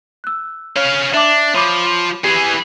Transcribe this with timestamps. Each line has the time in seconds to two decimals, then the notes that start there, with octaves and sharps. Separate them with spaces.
0.24 E6 F#6
0.76 C#4 C#5 F5
1.14 D4 E5 A5 D6
1.54 F3 C#5 B5 D6
2.24 E3 G4 G#4